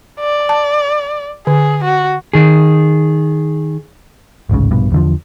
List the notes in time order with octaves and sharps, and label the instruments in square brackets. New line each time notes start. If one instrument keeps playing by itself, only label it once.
[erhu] D5
[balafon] A5
[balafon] D3 [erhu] G#4
[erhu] F#4
[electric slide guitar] D#3 G#4
[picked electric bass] A1 D2 G#2 C#3
A#1 G2 B2
E2 D3 F3